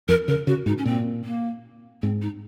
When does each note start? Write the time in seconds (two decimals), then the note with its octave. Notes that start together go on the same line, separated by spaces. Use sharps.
0.08 F2 A#4
0.28 C#3 A#4
0.47 C#3 F#4
0.66 G#2 D#4
0.78 C#4
0.85 A#2 C4
1.25 A#3
2.02 G#2 C4
2.22 D#4